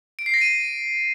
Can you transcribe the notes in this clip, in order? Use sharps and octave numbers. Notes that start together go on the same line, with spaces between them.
D7
C7
A#6
D#7